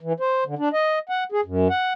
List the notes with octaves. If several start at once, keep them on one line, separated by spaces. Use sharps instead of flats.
E3
C5
D3
D4
D#5
F#5
G#4
F#2
F#5